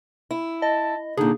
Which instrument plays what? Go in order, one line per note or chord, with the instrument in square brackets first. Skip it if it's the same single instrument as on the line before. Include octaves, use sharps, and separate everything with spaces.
[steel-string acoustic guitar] E4
[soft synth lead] D#5 [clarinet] A5
[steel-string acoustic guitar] A#2 D3 [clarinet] D#4 [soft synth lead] G#4